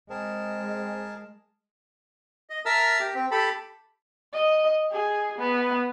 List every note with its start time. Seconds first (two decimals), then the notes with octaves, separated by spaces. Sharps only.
0.10 G#3 C4 G#4 A#4 A5
2.50 D#5
2.66 A#4 E5 A5 A#5 E6 F6
3.00 G4
3.15 C4
3.31 G4 A4 A5 B5
4.34 D#5
4.92 G#4
5.39 B3